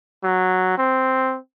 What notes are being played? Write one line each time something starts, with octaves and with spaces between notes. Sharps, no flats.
F#3
C4